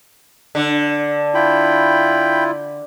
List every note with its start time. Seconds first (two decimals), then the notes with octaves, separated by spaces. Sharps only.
0.55 D3
1.34 E4 F4 G5 B5